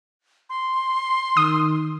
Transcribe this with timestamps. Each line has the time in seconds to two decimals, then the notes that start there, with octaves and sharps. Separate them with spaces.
0.50 C6
1.37 D#3 D#6